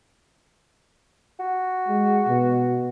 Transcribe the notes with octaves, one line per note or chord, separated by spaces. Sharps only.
F#4
G#3
B2